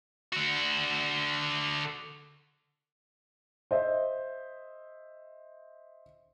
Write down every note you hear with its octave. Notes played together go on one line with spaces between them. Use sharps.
D3 F#4
C5 D#5 E5